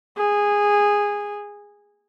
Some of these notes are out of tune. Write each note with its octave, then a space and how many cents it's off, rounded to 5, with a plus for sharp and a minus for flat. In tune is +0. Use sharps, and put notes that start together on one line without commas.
G#4 -15